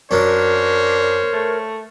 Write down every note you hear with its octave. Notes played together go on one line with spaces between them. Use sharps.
F#2 F#3 C#4 D4 A#4 C5 C#5
A3